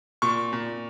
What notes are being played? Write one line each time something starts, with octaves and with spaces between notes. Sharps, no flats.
A#2 C#6
A#2